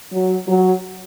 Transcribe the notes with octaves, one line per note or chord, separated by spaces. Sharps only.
F#3
F#3